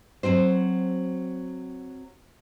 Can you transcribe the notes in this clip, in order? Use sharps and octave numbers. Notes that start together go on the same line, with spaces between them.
F#3 C4 F#4 C5